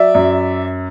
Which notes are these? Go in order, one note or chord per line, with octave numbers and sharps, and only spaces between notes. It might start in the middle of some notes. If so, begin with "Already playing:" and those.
Already playing: F#3 D5 E5
F#2